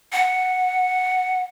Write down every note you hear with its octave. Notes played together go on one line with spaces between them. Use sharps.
F#5